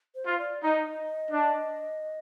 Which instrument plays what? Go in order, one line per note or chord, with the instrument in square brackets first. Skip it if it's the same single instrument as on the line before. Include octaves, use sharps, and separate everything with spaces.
[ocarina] C5
[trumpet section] F4
[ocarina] D5
[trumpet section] D#4 [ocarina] D#5
[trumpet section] D4